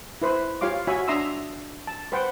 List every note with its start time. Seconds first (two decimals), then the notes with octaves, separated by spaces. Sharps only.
0.22 E4 B4 C5
0.61 F4 G4 C#5 F5 C6 D6
0.87 F#4 C#5 E5 G#5 B5
1.08 D4 E5 A#5 C6 D#6 E6
1.87 A5
2.12 B4 C5 F#5 G5